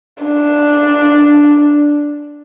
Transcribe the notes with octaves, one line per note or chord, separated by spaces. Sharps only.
D4